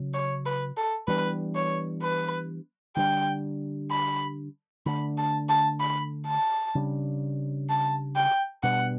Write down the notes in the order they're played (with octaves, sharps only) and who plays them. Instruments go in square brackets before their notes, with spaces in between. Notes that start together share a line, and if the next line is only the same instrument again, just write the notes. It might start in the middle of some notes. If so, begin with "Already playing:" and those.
Already playing: [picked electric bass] C#3 F#3 C#4
[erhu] C#5
B4
A4
[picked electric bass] E3 G3 B3 D4 [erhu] B4
[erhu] C#5
B4
[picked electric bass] D3 G3 B3 D4 [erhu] G5
[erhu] B5
[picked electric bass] D3 A3 D4 [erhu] B5
[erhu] A5
A5
B5
A5
[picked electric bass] C#3 G3 D4
[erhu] A5
G5
[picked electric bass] B2 G3 B3 D4 [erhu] F#5